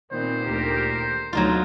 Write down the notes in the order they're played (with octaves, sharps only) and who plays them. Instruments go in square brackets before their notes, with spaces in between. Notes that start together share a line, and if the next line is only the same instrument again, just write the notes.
[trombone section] A#2 D#3 [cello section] B3 C4 [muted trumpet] C5
[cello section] D2 G4 A#4
[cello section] D2 [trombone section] G#2 B2 [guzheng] F#3 D#4 F4